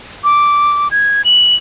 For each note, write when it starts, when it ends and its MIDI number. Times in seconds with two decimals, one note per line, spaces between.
0.24 0.88 86
0.91 1.22 92
1.25 1.56 102